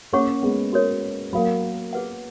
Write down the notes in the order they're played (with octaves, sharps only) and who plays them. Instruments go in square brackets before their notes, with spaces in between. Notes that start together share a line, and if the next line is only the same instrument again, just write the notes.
[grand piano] A#3 C#4 [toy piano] G#4 C#5 F#5 C#6
[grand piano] G#3 B3
[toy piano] F#4 A#4 C#5
[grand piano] F#3 A#3 [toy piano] A#4 F5 B5
[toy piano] G#4 B4 F#5